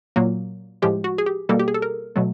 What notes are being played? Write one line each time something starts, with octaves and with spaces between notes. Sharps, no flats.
A#2 F#3 A#3
A2 F3 G#3 G4
F#4
G#4
G4
B2 G3 A#3 A4
G4
G#4
A4
A#4
B2 F#3 A3